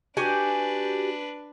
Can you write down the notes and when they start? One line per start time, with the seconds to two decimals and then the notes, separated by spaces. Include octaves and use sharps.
0.17 D4 F#4 G4 B4 G#5